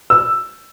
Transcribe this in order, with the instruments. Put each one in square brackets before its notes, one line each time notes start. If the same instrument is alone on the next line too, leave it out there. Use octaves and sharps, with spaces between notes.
[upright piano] E6